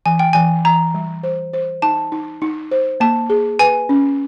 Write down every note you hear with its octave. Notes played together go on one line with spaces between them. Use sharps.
E3 G#5
G5
E3 G#5
E3 A#5
G3
C5
C5
D#4 A5
D#4
D#4
C5
A#3 A5
G#4
B4 G#5
C#4